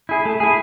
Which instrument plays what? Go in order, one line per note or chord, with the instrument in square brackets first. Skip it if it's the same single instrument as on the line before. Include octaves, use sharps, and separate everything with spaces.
[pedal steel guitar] E4 G#4
A3
E4 G#4